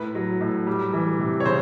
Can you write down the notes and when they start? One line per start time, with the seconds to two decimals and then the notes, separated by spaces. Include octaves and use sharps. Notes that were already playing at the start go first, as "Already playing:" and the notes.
Already playing: A2 B4
0.15 F#3
0.41 A2
0.67 G3
0.93 E3
1.19 C3
1.40 C#5
1.46 C#3 C5